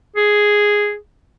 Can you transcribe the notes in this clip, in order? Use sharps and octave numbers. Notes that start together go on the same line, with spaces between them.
G#4